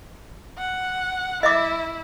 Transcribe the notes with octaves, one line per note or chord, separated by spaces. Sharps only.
F#5
E4 D#5 E5 D6